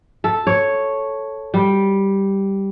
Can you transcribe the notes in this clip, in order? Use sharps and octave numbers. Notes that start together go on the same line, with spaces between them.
A4
C#5
G3